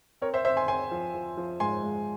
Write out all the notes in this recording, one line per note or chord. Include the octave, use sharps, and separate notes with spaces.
C4 A#4 C#5
C5 E5
C4 C5 E5
G#5 C6
C4 G#5 C6
F3
F3
F3
G#2 G#5 C6
G#3